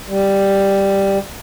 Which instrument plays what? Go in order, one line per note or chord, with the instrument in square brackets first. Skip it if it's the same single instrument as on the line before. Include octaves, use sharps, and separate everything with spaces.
[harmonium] G3